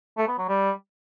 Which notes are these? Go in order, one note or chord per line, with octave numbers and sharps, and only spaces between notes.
A3
B3
F#3
G3